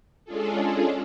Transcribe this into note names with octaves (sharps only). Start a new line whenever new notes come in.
G#3 C#4 D4 F4 G#4 A4